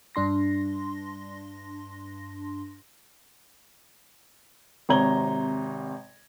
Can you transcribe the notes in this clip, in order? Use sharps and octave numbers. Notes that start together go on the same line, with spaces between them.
G2 D4 C6 A#6
G#1 C3 C#5 A#5 G#6 G7